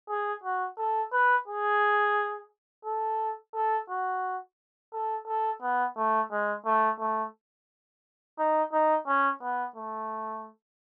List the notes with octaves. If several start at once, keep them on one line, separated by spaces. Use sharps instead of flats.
G#4
F#4
A4
B4
G#4
A4
A4
F#4
A4
A4
B3
A3
G#3
A3
A3
D#4
D#4
C#4
B3
A3